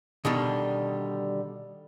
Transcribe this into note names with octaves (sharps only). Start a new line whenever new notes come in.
B2 D3 D#3 G3